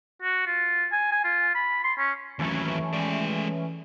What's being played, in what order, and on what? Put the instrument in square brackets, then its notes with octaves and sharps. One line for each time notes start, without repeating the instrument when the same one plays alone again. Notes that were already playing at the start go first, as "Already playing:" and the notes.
[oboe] F#4
F4
G#5
G#5
F4
B5
C6
C#4
[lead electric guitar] D#2 F#3 [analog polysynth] E3 A3 C#4
[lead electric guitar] G#3 D5